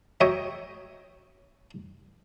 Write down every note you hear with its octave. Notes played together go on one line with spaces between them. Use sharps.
F#3 C#5 D#5 E5 G5